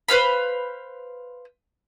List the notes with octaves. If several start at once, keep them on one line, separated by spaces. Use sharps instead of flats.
B4 C5 F5 B5